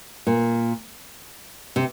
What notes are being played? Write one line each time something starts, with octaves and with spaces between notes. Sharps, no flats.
A#2
C3